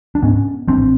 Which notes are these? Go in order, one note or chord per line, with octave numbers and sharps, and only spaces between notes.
D4
G#2 B3 C#4
A1 C4 D4